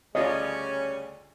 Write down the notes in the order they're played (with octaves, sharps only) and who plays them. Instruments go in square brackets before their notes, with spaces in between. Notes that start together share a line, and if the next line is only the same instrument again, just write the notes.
[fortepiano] D2 D4 F4 [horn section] C#3 G3 C#4 [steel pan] D#5